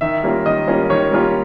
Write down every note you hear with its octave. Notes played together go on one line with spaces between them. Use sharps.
D#3 E5
G3 A#3 C#4 F4
D#3 D#5
G3 A#3 C#4 F4
D#3 C#5
G3 A#3 C#4 F4